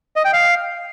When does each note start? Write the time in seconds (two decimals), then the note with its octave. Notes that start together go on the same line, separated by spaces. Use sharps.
0.16 D#5
0.25 G5
0.33 F5